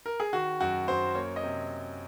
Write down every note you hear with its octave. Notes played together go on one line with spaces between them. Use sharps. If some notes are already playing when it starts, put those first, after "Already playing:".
A#4
G#4
D#3 F#4
F#2 F#4
F#2 C5
A#3 C#5
D#5
C3